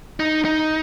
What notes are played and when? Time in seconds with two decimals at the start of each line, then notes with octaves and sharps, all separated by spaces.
0.20 D#4
0.45 D#4